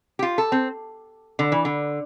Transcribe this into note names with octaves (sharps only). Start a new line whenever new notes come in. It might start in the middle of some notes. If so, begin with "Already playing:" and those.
G4
F4
A4
C4
D3
E3
D3